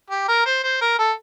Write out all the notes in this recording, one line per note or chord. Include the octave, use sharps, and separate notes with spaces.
G4
A#4
C5
C5
A#4
A4